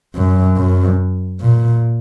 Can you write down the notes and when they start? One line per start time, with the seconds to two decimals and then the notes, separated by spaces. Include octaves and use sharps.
0.16 F#2
0.57 F#2
1.41 A#2